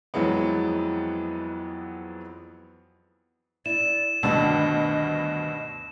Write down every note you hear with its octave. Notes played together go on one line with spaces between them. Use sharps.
F2 E3 F#3 G#3 B3
E4 D5 E7
D2 G2 B2 D#3 D4 D#5 A5